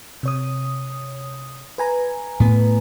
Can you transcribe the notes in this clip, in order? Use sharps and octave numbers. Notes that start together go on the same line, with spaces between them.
C3 C#5 D#6
B4 G#5 A#5
A2 B3